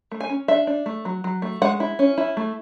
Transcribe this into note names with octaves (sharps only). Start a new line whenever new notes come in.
A3
G#5
C#4
D4 E5
D4
A3
F#3
F#3
A3
G#3 F#5
E4
C#4
E4
A3